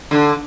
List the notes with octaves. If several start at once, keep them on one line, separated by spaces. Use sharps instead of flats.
D3